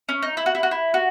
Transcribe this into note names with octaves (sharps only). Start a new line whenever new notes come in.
C#4
D#4
E4
F#4
E4
F#4
E4
F#4